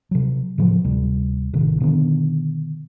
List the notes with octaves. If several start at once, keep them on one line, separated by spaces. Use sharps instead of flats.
C3 F#3
A2 C#3 F3 F#3
D2 C3 G3
A1 C3 D#3
B2 D3 D#3 B3